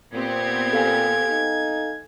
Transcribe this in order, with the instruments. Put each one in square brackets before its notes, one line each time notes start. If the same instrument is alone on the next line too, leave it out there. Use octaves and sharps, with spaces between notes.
[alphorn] A#2 [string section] B3 C4 G4 [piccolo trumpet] G#6
[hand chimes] A4 F5 G#5
[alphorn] D#4